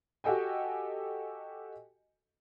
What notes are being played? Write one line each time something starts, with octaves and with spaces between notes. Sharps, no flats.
F#4 G4 A4 D#5 G5 G#5